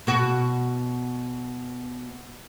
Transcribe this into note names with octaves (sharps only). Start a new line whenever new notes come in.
B2 F#4